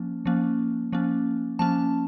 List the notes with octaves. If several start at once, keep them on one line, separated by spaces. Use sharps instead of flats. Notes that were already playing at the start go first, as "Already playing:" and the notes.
Already playing: F3 A#3 C#4
F3 A#3 C#4
F3 A#3 C#4
F3 A#3 C#4 A5